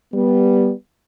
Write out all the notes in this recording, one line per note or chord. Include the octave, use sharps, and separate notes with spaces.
G3 B3